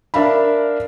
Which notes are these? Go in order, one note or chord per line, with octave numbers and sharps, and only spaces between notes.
D4 A#4 E5 F5 B5